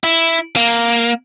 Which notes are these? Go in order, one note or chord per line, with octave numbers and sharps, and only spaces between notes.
E4
A#3